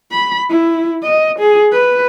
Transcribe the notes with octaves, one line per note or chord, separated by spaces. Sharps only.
B5
E4
D#5
G#4
B4